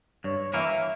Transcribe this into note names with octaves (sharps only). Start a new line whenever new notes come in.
G2 C#5
E3 A#3 E5